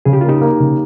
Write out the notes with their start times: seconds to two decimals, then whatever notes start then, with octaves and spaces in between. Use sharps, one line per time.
0.05 C#3 G#4
0.13 G4
0.21 A#3 F4
0.29 D#4 G4
0.42 A#3
0.60 C#3